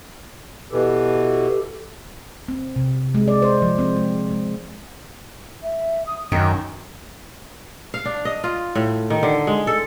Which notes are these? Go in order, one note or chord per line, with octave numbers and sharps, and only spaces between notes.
B2 E3 G4 A4
C4
C3
G#3
D5
C5
F3
C4
G#3
G#3
E5
D#6
F#2 D#3 G5
F5
D4
D#5
F4
A2
D#3
D3
G#3
A4